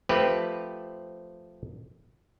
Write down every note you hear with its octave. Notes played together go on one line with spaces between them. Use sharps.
F3 A3 C4 G4 B4